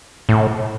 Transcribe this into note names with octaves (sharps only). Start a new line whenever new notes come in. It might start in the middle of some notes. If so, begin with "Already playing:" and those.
A2